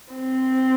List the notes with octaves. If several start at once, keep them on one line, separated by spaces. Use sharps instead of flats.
C4